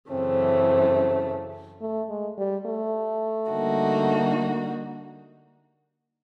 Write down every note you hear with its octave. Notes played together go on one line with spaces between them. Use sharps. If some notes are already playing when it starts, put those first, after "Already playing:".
F#2 C#3 E3 A3 C4
A3
G#3
G3
A3
D3 G3 A#3 D#4 F#4